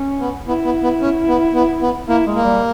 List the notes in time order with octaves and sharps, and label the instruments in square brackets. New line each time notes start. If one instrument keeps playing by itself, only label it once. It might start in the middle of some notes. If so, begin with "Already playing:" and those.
Already playing: [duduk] C#4
[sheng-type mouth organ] B3
[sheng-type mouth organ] B3 [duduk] E4
[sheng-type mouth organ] B3
B3
C#4
B3
B3
B3
[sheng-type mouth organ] A#3 [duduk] E4
[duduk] G#3
[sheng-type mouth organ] A#3
[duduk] G3